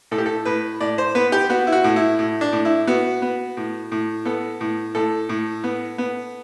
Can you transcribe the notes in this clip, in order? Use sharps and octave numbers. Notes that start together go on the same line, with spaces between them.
A2 A4
G4
A4
A2 B4
A2 D5
C5
B3 B4
G4
B3 F#4
E4
F#4
A2
E4
A2
D4
A2
E4
B3 F#4
B3
A2
A2
B3 A4
A2
A2 A4
A2
B3
B3